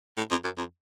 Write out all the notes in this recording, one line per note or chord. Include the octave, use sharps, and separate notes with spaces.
A2
F2
F#2
F2